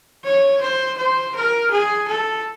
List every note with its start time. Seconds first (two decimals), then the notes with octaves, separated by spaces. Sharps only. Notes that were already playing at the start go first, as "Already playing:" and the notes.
0.24 C#5
0.61 C5
0.98 C5
1.35 A#4
1.71 G#4
2.08 A4